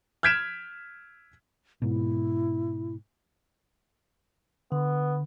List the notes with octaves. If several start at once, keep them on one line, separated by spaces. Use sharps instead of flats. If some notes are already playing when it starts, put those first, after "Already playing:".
F6 G6 G#6 B6 D7 E7
G#2 B2 E4
D3 B3